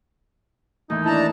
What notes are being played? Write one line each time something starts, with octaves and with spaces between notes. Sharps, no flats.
D#2 A2 E3 D#4
D4 E4 A5 A#5